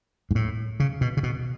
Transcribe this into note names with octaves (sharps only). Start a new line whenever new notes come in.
G#2
A2
C#3
B2
C#3
B2